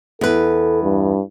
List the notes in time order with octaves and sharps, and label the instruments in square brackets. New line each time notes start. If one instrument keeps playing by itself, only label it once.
[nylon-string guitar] E2 B4 [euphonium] A4
[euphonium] G2